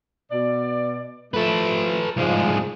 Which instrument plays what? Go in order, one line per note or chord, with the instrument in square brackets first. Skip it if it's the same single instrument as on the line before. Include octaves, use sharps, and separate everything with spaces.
[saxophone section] B2 D5
[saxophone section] F3 A3 [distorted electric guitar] A4 B4
[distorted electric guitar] C2 G#3 [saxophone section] G#2 F3